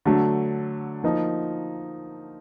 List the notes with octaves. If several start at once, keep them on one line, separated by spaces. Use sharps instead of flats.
D3 F#3 A3
F3 A#3 D#4